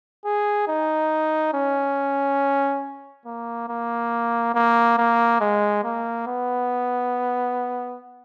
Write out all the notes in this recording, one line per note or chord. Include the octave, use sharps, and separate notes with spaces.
G#4
D#4
C#4
A#3
A#3
A#3
A#3
G#3
A#3
B3